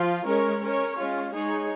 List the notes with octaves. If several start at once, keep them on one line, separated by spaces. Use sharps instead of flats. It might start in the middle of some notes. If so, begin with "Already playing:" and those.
Already playing: F3 F4
G#3 C#4 A#4 C#5
C#4 A#4 C#5
G#3 C#4 F4
G#3 D#4 G#4 C#5